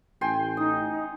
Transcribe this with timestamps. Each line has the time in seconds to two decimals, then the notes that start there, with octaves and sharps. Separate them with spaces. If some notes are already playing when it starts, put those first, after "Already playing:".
0.21 A1 G5 G#5 C6
0.57 D#4 D#6